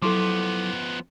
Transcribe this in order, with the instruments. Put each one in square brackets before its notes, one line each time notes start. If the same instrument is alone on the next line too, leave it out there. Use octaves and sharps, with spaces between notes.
[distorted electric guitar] F3 B3 [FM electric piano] F#3 A4 [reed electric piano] E4 C6 D6